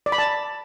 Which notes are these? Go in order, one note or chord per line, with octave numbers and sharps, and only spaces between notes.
D5
B5
A5